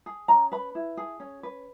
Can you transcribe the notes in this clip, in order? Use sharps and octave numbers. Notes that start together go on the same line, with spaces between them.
G#4
C#4 A#5
B4 B5
E4
G#4
C#4
B4